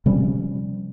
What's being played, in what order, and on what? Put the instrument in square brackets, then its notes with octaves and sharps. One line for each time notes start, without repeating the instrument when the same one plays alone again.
[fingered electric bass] C3 F3 G3 C#4